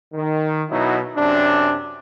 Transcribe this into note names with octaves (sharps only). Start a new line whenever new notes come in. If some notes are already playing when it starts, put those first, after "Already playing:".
D#3
B2 F#3 D#4 E4
F#2 C3 D4